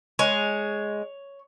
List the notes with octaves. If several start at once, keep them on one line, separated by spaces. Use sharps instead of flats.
G#3 C#5